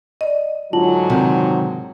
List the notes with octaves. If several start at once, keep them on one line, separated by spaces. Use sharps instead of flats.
D5 D#5
G#2 D3 F#3 F4 A5 F#7
C3 D#3